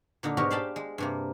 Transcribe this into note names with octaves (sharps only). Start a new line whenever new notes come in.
A#2 D3 D#4 D5
G#2 B2 C#4 F#4 G4 A#4
C5 D5 F5 G5 A5 B5
G#3
G2 C3 A#3